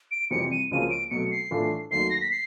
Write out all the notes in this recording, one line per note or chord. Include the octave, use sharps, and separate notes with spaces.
D7
F2 C3 E3 G3 C4 C#7
D#7
C#2 C#3 F3 A#3 C#4 D#7
D7
B2 F#3 A3 C#7
C7
A2 E3 A3 D4 F4
D#2 D#3 F#3 A3 C7
A#6
B6
C7